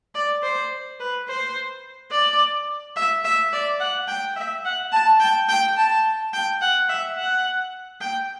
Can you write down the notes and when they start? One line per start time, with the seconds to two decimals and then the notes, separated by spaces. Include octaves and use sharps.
0.15 D5
0.43 C5
1.00 B4
1.28 C5
2.12 D5
2.96 E5
3.25 E5
3.53 D5
3.80 F#5
4.08 G5
4.36 E5
4.65 F#5
4.92 A5
5.20 G5
5.49 G5
5.77 A5
6.34 G5
6.62 F#5
6.89 E5
7.17 F#5
8.01 G5